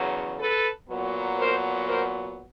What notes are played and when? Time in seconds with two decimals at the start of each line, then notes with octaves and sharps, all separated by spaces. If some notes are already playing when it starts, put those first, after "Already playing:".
Already playing: E2 C#3 F#3
0.39 A4 B4
0.89 A#2 F#3 B3
1.37 A#4 C5
1.86 A#4 C5